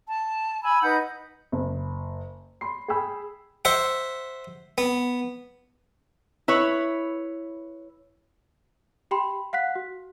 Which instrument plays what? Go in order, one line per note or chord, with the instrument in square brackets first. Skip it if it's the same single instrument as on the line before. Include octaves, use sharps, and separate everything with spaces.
[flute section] A5
G#5 B5 E6
D#4 B4 F#5 G6
[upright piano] F#1
B5 C6 C7
G#4 G5 G#5 B5 E6
[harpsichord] C5 E5 F#5
B3
[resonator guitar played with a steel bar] E4 B4 C#5
[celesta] G4 G5 B5 C6
F5 F#5 F#6 B6
F#4